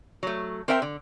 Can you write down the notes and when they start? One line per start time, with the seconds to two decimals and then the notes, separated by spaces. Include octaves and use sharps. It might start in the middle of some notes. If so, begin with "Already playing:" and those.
0.23 F#3 A3
0.68 C4 A#4 C5 E5 G5
0.82 D3